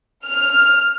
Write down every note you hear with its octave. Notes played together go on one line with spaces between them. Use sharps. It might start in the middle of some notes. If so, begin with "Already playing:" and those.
F6